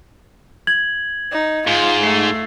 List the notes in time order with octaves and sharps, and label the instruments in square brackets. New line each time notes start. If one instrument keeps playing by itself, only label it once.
[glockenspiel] G#6 F#7
[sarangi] D#4
[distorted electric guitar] G#2 [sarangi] F4
[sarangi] A3 [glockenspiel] C7